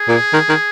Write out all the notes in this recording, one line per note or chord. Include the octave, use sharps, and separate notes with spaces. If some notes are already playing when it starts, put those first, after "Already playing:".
Already playing: G#4
A#2
D#3
D#3